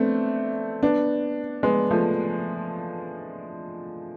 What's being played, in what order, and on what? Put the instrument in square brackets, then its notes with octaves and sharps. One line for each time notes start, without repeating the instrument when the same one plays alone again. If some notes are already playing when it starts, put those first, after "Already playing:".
Already playing: [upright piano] A3 B3 C4 D4 E4
B3 D4
G#3 B3
F3 A3